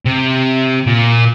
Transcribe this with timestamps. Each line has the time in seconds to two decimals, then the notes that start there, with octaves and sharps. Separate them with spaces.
0.05 C3
0.87 A#2